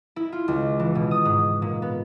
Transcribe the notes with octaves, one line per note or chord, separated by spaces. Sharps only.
E4
F4
C#2
E3
B2
D#6
G#2
A#2
B3